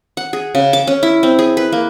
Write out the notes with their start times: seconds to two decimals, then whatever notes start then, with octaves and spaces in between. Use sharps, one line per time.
0.17 F#5
0.33 G#4
0.55 C#3
0.73 D6
0.87 C#4
1.03 E4
1.23 C4
1.39 G#4
1.57 B4
1.72 A#3